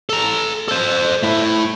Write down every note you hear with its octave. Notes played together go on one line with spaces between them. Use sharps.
A4 A#5
A4 C5
A3 E4